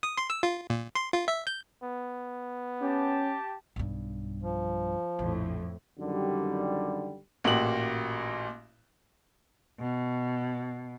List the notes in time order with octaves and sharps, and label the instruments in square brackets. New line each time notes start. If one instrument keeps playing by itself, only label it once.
[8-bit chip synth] D#6
C6
E6
F4
A#2
C6
F4
E5
G6
[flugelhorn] B3
[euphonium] C#4 [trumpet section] G4 A5
[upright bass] B1 G2
[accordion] F3
[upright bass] A#1 [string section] F2 A2
[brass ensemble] F#2 D3 D#3 G3
[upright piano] A1 A#2 F#4 G4 F#7
[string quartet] B2